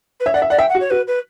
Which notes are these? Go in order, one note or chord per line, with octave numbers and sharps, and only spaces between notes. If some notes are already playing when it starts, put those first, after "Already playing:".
B4
C#5 E5
D5 F#5
E5
D5 F#5
E5 G5
F#5
F#4
C#5
F#4 B4
B4